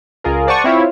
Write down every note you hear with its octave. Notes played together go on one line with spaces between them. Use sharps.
C#2 F4 G#4 A#4
C5 D5 F#5 A5 C#6 D#6
C4 E4 F4 C#5